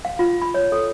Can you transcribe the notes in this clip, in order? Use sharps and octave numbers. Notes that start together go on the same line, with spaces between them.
F5
F4
B5
C#5
A4